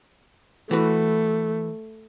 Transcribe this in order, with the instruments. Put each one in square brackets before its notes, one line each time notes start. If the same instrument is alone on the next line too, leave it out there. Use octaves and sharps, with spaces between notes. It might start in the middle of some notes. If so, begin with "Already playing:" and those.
[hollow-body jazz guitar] E3 F#4 B4 [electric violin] A3